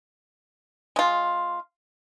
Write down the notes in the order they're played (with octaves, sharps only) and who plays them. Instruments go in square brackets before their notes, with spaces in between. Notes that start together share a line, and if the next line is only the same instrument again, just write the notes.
[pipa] G#3 F4